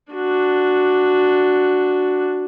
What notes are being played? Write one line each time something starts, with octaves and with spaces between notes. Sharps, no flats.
D4 F#4